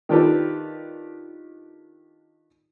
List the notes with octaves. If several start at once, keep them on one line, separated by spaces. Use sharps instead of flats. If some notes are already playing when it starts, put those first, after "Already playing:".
D#3 D4 F4 G4 A4 B4